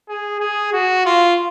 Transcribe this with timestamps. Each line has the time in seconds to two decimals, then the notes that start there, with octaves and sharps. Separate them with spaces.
0.09 G#4
0.41 G#4
0.73 F#4
1.06 F4